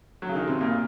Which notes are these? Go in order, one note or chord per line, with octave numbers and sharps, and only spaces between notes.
F#3
C#3
D#3
C3
A#2